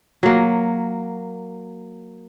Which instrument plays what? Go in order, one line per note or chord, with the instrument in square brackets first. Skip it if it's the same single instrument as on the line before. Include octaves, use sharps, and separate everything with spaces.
[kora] F#3 A#3